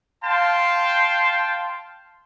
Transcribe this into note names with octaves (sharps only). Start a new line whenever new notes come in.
F5 G5 A5 C6